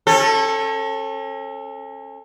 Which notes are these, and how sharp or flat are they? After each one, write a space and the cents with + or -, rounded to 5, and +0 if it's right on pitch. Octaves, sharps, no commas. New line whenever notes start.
C#4 -35 A4 +10